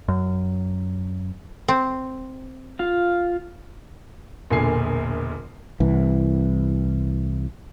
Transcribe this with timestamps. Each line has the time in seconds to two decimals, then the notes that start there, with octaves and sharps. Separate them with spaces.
0.08 F#2
1.68 C4
2.79 F4 F5
4.50 E1 A#1 A#2 D3 G#5 C7
5.80 C2 E3